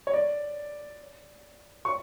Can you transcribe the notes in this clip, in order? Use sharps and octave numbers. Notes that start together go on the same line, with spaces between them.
C#5
D5
C#6